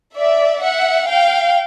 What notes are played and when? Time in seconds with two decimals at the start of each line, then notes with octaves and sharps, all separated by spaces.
0.17 D5 E5
0.61 E5 F#5
1.06 F5 G5